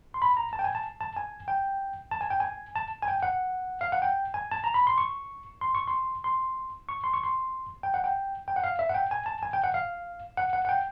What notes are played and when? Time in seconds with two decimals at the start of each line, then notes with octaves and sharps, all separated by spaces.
0.14 C6
0.22 B5
0.37 A#5
0.53 A5
0.59 G5
0.64 G#5
0.75 A5
1.01 A5
1.17 G#5
1.48 G5
2.11 A5
2.21 G#5
2.30 G5
2.40 G#5
2.75 A5
3.02 G#5
3.08 G5
3.23 F#5
3.81 F5
3.92 F#5
4.02 G5
4.34 G#5
4.52 A5
4.64 A#5
4.74 B5
4.87 C6
4.98 C#6
5.61 C6
5.75 C#6
5.87 C6
6.24 C6
6.89 C#6
7.04 C6
7.14 C#6
7.24 C6
7.83 G5
7.94 F#5
8.04 G5
8.48 G5
8.56 F#5
8.64 F5
8.79 E5
8.89 F#5
8.94 G5
9.11 G#5
9.26 A5
9.43 G#5
9.53 G5
9.64 F#5
9.74 F5
10.37 F#5
10.53 F#5
10.65 F#5
10.69 G5